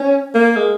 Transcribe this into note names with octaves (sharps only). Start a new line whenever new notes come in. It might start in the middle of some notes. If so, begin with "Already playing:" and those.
Already playing: C#4
A#3
G#3